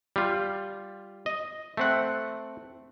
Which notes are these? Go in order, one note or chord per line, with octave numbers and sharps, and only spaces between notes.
G3 F4
D#5
A3 C4 F#5